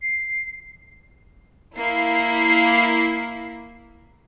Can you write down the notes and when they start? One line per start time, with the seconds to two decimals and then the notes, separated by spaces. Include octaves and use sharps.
0.02 C7
1.76 A#3 E4 C7